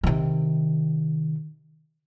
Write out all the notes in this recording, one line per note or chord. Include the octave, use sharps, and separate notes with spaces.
C3 D#3